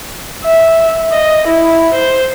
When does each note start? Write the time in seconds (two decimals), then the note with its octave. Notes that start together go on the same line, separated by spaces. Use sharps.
0.44 E5
1.11 D#5
1.46 E4
1.93 C5